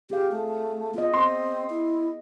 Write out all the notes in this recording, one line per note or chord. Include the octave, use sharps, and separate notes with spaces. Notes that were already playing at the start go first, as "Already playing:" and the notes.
C4 G4 G#4 F5
A3
B3 F4 D#5
C4 C6
E4